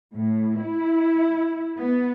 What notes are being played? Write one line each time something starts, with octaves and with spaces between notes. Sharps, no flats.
A2
E4
B3